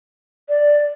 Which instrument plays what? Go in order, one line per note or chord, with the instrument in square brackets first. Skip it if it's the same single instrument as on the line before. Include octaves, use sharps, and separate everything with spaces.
[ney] D5